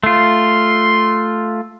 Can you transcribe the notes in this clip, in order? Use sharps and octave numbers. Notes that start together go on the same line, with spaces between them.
A3 F4 C6